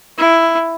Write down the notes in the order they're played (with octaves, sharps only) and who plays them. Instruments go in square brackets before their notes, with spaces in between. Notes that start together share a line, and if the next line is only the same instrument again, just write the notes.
[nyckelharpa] E4